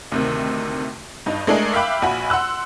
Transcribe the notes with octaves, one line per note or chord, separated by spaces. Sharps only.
D2 C3 D#3
G2 D#4
G#3 A3 D4 G#4 A#4
E5 F5 G5 B5 D6 F#6
A#1 F#4 G#5 B5
F#5 C6 E6 F#6